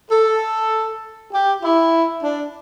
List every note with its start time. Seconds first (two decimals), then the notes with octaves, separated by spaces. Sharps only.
0.10 A4
1.31 G4
1.62 E4
2.23 D4